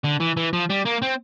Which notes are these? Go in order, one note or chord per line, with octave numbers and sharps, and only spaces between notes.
D3
E3
E3
F3
G3
A#3
C4